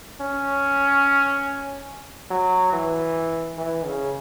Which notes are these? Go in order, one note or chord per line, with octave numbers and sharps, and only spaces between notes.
C#4
F#3
E3
E3
C#3